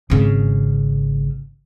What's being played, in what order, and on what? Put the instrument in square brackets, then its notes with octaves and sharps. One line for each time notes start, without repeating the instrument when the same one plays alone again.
[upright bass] G#1 C#3